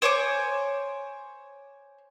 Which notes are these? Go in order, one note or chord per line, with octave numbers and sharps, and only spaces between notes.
C5 C#5 G#5 D6